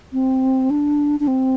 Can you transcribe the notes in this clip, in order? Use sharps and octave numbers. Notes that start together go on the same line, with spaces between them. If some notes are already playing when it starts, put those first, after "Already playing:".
C4
D4
D4
C4